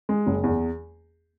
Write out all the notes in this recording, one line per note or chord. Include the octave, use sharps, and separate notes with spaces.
G#3
F#1
E2